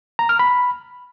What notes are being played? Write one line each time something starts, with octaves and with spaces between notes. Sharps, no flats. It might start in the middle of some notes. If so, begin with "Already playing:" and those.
A#5
F6
B5